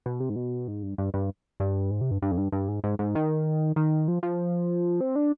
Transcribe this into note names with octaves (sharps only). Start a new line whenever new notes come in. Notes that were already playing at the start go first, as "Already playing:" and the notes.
B2
C3
G#2
B2
G#2
G2
G2
G2
G2
G#2
C3
G2
G2
F2
G2
G2
G#2
G#2
G#2
D#3
D#3
F3
F3
C4
D4